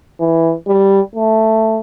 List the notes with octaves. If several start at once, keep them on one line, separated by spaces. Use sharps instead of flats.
E3
G3
A3